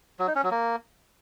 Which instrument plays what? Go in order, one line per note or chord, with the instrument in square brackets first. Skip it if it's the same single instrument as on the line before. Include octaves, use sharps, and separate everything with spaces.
[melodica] F#3
D#4
C#4
F#3
A#3